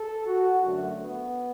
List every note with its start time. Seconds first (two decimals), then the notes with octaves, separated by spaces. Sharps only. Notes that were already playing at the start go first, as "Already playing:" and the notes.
Already playing: A4
0.26 F#4
0.63 F#2 D3 F#3 A3
1.00 B3